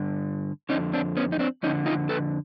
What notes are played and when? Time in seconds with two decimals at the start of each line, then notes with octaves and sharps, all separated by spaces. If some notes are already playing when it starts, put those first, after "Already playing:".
Already playing: G2 D3
0.69 D3 C#4 D#4
0.73 F2
0.93 C4 D4
1.17 B3 C#4
1.32 D#4
1.39 C4 D4
1.63 F2 D3 C#4 D#4
1.86 D#4 F4
2.09 A4 B4